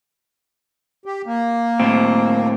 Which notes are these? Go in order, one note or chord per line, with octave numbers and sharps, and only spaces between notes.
G4
A#3
A2 C4